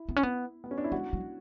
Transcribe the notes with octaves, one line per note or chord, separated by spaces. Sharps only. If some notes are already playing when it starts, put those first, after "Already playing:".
Already playing: E4
B3
C#4
B3
B3
C#4
D4
E4
G#3 F#4
F#3